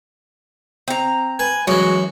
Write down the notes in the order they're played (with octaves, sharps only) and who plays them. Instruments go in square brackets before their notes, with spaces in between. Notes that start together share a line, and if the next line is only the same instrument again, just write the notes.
[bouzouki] C4 A#5
[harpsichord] B4 [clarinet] G#5
[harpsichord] F#2 E3 [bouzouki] G#3 [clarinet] F#4